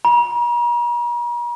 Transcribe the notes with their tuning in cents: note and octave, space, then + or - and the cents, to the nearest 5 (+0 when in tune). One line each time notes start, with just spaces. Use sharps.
A#5 +45